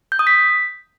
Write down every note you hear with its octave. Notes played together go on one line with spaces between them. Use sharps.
G6
D#6
B6